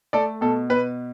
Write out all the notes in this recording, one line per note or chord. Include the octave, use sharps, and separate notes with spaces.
A3 A4 D5
B2 A4
B2 B4